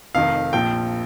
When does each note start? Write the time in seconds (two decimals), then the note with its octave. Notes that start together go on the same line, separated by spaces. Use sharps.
0.15 F1 F2 D#3 F5
0.53 A#1 A#2 F3 G5